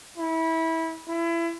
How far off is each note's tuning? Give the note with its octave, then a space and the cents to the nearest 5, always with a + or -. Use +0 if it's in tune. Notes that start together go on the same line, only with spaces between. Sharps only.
E4 -20
E4 +30